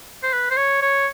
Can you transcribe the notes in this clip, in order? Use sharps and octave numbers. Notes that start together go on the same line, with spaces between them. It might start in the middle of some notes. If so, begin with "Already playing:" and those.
C5
B4
C5
C#5
C#5